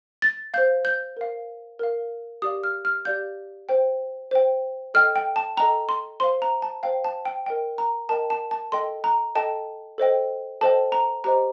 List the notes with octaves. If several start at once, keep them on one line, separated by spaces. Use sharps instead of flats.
A6
C5 F5 G6
G6
A#4 F5
A#4 F5
G4 D5 F5 D#6
F6
F6
G4 D5 F5 G6
C5 G5
C5 G5
A4 D#5 G5 F6
G5
A5
A4 D#5 G5 A#5
C6
C5 F5 C6
A#5
A5
C5 F5 G5
A5
G5
A#4 D#5 G5
A#5
A#4 D#5 G5 A5
A5
A5
A4 D#5 G5 C6
A#5
A4 D#5 G5 A5
A4 C5 D#5 G5
A4 C5 D#5 G5 A5
A#5
G4 C5 D#5 A#5